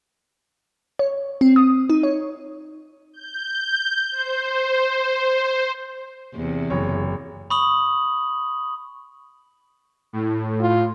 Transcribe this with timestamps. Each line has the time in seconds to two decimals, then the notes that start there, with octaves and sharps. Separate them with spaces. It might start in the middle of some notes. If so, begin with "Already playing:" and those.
0.99 C#5
1.41 C4
1.56 D#6
1.90 D#4
2.03 C#5
3.13 G6
4.11 C5
6.35 E2 C3
6.70 F#1 C#5
7.50 B5 C#6 D#6 F#7
10.13 A2
10.61 F4